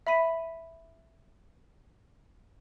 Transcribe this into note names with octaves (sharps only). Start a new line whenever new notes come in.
E5 B5 B6 D#7